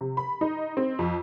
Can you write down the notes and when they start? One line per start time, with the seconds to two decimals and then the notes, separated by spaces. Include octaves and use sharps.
0.01 C3
0.17 B5
0.41 D#4
0.77 C4
0.99 F2